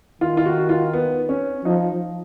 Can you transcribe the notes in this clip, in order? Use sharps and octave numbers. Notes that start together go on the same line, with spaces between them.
D#3 F4
F4
F#4
F#4
F4
B3
C#4
F3 D#4